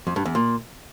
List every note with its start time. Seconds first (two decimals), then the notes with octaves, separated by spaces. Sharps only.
0.07 F2
0.16 G2
0.26 E2
0.35 A#2